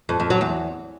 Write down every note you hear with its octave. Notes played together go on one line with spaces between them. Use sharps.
F2
F2
F#3
E2